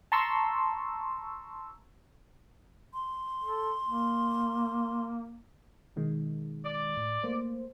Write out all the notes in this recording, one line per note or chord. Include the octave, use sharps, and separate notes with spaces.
A5 A#5 C6 C#6 E6
C6
A4
A#3
B2 D#3 G#3
D5
A2
A3 A#3 C5